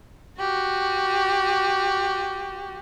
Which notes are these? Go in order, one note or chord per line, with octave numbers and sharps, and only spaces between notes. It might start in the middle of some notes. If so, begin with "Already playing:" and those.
F#4 G4